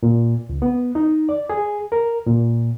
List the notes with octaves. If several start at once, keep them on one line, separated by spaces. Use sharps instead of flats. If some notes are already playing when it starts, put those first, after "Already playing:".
A#2
C#2
B3
D#4
D5
G#4
A#4
A#2